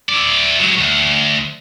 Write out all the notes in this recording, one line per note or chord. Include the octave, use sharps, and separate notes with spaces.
E4 D5
F#3 G#3
D2